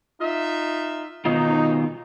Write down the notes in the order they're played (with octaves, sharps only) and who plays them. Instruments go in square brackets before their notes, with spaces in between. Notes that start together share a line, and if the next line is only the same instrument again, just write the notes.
[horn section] D#4 F4 E5
[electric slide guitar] B2 D#3 F4 [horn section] D#4